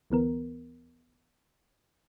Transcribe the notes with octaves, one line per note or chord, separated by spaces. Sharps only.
D2 E3 B3 A#4